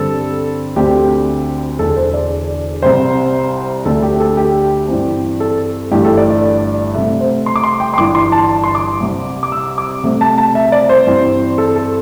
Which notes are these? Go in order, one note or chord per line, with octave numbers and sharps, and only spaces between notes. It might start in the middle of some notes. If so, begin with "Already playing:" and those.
Already playing: G2 D3 G3 C4 A4
D2 D3 C4 G4
E1 E2 D3 A4
C5
D5
C2 C3 G3 C5
D2 D3 A3 A4
G4
A4
G4
G2 E3 C4
A4
G1 G2 E3 A3 D4 G4
A4
D5
D5
C2 C3 A3 E5
C5
C6
D6
C6
G5
C6
G1 G2 E3 D6
C6
A5
A5
C6
D6
C2 C3 G3 C4
D6
E6
D6
C2 C3 A3
A5
A5
E5
D5
C5
G2 E3 C4
A4
A4